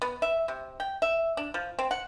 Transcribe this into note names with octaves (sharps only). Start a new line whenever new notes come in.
B3
E5
C3
G5
E5
D4
F3
C4
F#5